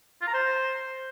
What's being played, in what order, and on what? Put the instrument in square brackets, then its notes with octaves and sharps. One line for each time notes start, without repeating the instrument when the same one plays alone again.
[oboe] F4
A#5
C5